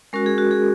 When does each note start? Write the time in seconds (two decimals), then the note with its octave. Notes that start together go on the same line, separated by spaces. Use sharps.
0.13 G#3 C#4 F#4 A#4
0.26 G#4
0.38 F#4
0.51 G#4